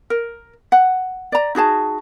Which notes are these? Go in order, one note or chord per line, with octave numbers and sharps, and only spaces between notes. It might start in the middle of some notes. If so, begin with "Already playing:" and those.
A#4
F#5
D5 A#5
D#4 F#4 G#4 A5